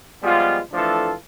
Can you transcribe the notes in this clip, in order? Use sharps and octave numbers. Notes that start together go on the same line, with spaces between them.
F3 G3 G#3 B3 F4
E3 F3 A3 D4 F4 A4